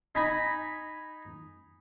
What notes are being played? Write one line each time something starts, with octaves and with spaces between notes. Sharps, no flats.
D#4 G#5 A#5 B5